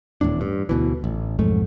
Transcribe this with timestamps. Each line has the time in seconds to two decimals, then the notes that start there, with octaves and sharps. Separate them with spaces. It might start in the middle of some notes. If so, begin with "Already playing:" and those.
0.21 D#1 E2 A2 D4
0.41 G2
0.69 D2 B2 E3
1.04 A1
1.39 B1 F2 G#2 A3